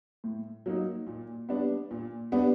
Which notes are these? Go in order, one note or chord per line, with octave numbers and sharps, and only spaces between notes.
A2
F#3 A#3 D#4
A#2
G3 B3 D4
A#2
G3 B3 D4